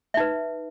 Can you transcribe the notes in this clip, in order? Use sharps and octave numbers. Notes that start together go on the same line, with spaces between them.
D#4 B4 E5